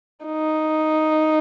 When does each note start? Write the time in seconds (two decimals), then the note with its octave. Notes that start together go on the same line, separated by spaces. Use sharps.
0.26 D#4